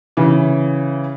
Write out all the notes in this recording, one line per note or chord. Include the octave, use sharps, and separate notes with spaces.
C#3 E3